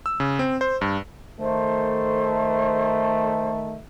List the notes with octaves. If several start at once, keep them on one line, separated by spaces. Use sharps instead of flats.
E6
C#3
C4
C5
G2
D#3 A3 C5